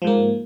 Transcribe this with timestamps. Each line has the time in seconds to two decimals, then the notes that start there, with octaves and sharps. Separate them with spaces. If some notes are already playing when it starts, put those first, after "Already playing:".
0.02 F3
0.04 G#2
0.07 A#3